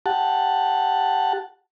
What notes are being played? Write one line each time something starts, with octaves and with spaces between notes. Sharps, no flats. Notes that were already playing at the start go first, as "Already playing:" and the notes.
G4 F#5 A5